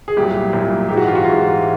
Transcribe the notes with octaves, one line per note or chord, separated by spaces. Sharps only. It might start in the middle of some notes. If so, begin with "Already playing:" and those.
G#4
C2 A#2 F#3 G4
C2 A#2 F#3
G#2 E3 G#3 G4
F#4
F4
F#4
G#2 E3 G#3 F4